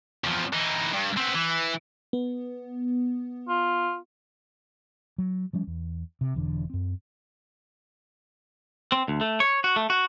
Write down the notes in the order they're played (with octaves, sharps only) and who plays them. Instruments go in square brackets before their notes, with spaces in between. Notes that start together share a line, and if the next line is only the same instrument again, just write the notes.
[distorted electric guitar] E2 F3
E3 D#4
G2
B3 C4
E3
[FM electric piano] B3
[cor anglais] F4
[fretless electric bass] F#3
F3 G3 C#4
E2
C3
E1 E2 D3
F#2 C4
[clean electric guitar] C4
D2
A3
C#5
F#4
A3
F#4